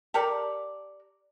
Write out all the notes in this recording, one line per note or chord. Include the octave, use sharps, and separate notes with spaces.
G4 A4 A#4 D5